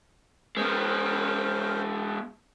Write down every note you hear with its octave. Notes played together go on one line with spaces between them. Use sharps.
G#3 B3 C#4 A#4 C5